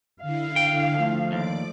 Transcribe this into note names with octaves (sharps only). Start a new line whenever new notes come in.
D3 E4 F5
G5
F3 A3
D#2 D5 D6